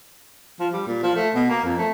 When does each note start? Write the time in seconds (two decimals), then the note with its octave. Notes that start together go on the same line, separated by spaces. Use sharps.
0.59 F3
0.72 G3
0.86 A#2
1.02 F3
1.15 A3
1.34 B2
1.49 A#3
1.64 F2
1.78 A3